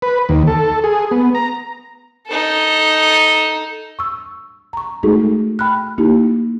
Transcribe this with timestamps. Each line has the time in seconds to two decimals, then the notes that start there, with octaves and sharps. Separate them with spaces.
0.02 B4
0.29 D#2
0.47 A4
0.84 G#4
1.11 B3
1.35 A#5
2.27 D#4 A4
3.99 C#6 E6
4.73 A#5 C#6
5.03 G#3 A3 D#4 F#4 G#4 A4
5.59 G5 B5 F6 F#6
5.98 A#3 D#4 E4 G4